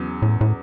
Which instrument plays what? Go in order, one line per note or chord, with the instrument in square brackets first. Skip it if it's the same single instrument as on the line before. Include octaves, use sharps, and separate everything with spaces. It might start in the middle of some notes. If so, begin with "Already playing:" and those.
Already playing: [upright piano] E2 C#3 F#3
[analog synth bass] A2
A2